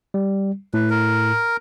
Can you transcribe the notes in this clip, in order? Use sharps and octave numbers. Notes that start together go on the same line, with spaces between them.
G3
A2 B4
A#4